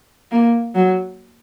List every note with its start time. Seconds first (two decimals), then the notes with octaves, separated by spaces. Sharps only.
0.32 A#3
0.75 F#3